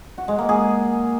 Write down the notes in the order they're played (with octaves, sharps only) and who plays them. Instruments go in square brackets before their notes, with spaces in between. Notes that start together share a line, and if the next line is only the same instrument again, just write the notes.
[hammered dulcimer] F#4
G#3
A#3
G#4